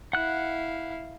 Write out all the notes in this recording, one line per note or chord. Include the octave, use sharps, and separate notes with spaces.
E4 F5 F#5 F#6